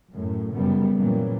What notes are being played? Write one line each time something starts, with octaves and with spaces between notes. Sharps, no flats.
F#2 A2
F#2 C#3 G3 B3
A#2 C#3 E3 F#3 G3 A#3